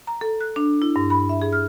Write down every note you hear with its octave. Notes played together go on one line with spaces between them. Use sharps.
A#5
A4
F#6
D4
E4
G2
B5
E5
G#4
F6